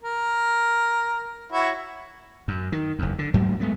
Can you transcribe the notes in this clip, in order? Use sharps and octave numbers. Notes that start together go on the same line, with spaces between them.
A#4
E4 F#4 C#5
F#2
D#3
F#1 E2
D3
G#2 F#3 A3 A#3
G#3 A3 B3